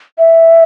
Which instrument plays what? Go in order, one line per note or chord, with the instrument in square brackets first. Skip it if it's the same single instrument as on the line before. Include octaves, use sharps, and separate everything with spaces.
[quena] E5